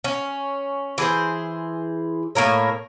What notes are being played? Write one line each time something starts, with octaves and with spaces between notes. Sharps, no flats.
C#4
E3 G#4 C5
A2 A#3 A#4 C#5